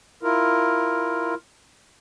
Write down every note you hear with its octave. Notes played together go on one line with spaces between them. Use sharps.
E4 F4 A#4